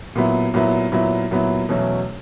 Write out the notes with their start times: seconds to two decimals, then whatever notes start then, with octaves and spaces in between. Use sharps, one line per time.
0.15 A#2 F#3 B3 E4
0.54 A#2 F#3 B3 E4
0.92 A#2 F#3 B3 E4
1.31 A#2 F#3 B3 E4
1.69 E2 B2 F#3 A3 C#4